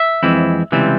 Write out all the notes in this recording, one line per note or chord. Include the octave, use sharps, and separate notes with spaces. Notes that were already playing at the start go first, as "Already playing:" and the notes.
Already playing: E5
F2 E3 G#3 C4 E4
C#2 C3 E3 G3 C4